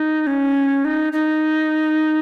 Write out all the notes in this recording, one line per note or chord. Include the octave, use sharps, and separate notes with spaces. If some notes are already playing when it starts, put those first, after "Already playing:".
Already playing: D#4
C#4
D#4
D#4